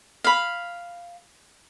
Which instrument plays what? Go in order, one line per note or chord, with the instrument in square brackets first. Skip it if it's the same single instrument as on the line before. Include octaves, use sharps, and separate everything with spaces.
[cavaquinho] F5 B5